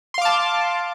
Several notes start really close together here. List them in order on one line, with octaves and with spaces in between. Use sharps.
C6 F5 D6 A5